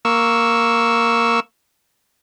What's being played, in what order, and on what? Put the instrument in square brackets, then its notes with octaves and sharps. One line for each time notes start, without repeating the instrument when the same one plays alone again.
[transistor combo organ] A#3 C#6 E6